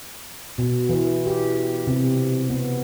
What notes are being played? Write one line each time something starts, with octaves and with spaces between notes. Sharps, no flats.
B2
E3
G4
C3
B3